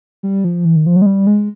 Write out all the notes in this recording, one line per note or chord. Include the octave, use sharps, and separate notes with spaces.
G3
F3
E3
D#3
F3
F#3
G#3
G3
G#3